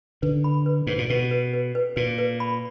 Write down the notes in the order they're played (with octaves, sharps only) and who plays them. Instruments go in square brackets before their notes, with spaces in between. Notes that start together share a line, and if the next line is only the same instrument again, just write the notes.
[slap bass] D3 [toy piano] B4
[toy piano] B5
B4
[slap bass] G#2 [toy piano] B4
[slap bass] A#2
[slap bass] B2 [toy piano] B4
[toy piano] B4
B4
B4
[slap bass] A#2 [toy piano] B4
[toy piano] B4
B5